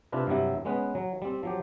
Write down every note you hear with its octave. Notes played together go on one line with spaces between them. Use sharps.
C3 D4 E4 F4 B4
G2 C3 F#3 G3 E4
G#3 B3 C#4 B4
F#3
G3 C4
F3 F#3 G4